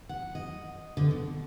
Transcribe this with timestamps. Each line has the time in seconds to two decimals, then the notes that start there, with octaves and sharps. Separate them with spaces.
0.09 F#5
0.35 D#5
0.97 D3
1.11 B2